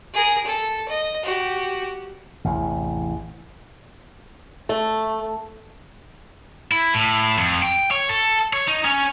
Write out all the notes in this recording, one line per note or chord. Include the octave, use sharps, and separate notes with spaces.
G#4 A#4
A4
D#5
F#4 G4
A1 E2 C3
A3
E4
A2
F2
G5
C#5
A4
C#5
D#4
C#4